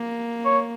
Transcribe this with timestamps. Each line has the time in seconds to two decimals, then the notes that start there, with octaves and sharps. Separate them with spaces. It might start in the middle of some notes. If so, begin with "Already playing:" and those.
Already playing: A#3
0.45 C#5